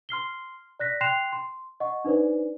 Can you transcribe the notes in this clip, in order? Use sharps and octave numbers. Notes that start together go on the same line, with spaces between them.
C6 F6 C7 G7
D5 F#6 A#6 B6
G5 C6 F#6 C7 E7 F7
C6
D#5 F#5 C#6
D4 D#4 B4 C5 D5